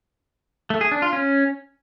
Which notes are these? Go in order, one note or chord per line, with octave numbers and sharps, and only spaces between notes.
A3
G#4
D4
F4
C#4